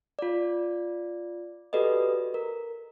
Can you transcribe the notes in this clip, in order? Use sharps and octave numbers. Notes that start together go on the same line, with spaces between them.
F4 D5
F#4 G4 A4 B4 D5 D#5
A#4